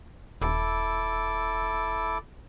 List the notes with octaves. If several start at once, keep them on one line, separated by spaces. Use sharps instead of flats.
D#1 E4 A4 D6